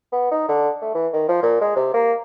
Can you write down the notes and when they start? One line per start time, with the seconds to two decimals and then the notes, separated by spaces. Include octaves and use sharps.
0.12 B3
0.31 D#4
0.48 D3
0.82 A3
0.94 E3
1.13 D#3
1.28 F3
1.43 A#2
1.61 G#3
1.76 C3
1.94 A#3